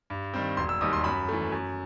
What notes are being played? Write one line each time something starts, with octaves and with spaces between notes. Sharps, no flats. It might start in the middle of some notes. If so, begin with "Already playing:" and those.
G2
D#3 G3 C4
E1 C6
E6
D#2 D#3 G3 D#6
C6
F#2 B5
E3 A3
F#2